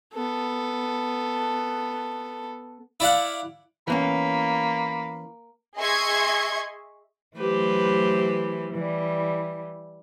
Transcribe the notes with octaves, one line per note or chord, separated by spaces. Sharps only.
B3 A4
E4 D5 F5 F#5
E3 A#3 B3 C#4 B5
G#4 D#5 E5 C6 C#6 G#6
E3 F#3 A3 G4 B4 C5
E3 G3